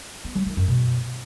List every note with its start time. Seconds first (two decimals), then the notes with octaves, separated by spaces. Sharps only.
0.24 B3
0.35 F#3
0.46 D#3
0.57 F#2
0.68 B2